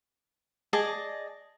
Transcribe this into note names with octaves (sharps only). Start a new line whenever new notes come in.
G#4 D5 D#5 A5